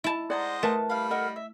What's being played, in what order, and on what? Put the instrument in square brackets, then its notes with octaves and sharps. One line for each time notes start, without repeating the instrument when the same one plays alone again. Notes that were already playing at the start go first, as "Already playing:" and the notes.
[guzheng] E4 A5
[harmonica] G#3 C5 D#5 [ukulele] D5 [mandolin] F#5 G#5 A#5
[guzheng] A3 [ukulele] A#4 B4 A5
[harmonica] G3 B5 [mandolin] F5 F6
[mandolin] A4 A#4 F#5 [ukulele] D#5
[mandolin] E5